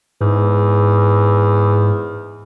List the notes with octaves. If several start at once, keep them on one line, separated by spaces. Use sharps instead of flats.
E2 G#2